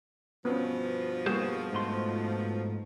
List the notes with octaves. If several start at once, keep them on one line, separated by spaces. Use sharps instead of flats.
G2 B2 F3 B3 C#4
G3 A#3 F#4 G#4 C5
G#2 A3 C6